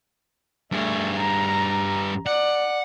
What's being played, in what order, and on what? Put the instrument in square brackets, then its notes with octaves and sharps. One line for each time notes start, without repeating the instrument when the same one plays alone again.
[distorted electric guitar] G2 G#4 [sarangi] A3
[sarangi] A#5
[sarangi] D5 [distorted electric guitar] F#5